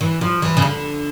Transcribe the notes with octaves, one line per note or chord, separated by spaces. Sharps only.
E3
F3
E3
C#3
D3